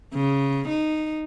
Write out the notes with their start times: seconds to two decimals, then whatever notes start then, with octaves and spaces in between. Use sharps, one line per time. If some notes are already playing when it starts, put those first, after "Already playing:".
0.14 C#3
0.69 D#4